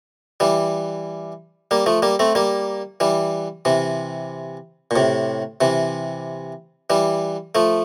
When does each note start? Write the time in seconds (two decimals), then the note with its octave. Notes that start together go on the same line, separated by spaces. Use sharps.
0.40 E3 G3
1.71 G3 A#3
1.86 F3 A3
2.02 G3 A#3
2.19 A3 C4
2.35 G3 A#3
3.00 E3 G3
3.65 C3 E3
4.91 A#2
4.96 A2 C3
5.61 C3 E3
6.90 E3 G3
7.55 F3 A3